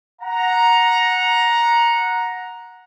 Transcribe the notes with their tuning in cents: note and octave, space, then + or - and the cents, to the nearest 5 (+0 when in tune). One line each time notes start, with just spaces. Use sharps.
F#5 -15 A#5 +10